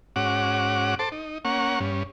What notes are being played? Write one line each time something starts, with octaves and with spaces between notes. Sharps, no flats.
G#2 C#4 F#4 F#5 D6
A4 C5 A5 D6
D#4
A#3 C#4 F#5 C#6
G2 C#4